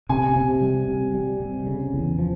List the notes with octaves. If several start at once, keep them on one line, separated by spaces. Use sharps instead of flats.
C3 G#5
C3
G3
C3
G3
C3
C#3
E2
F3